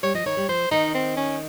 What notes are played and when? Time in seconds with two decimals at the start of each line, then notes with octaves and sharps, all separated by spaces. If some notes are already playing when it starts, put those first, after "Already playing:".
0.03 G3 C#5
0.14 F3 D#5
0.26 D#3 C#5
0.37 G3
0.48 F3 C5
0.71 D#3 D#4
0.94 C4
1.17 C#4